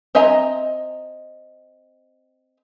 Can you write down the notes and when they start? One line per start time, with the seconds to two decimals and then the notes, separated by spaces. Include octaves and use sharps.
0.15 C4 D#5 E5 G#5 A#5